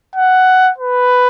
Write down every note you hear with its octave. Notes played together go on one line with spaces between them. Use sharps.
F#5
B4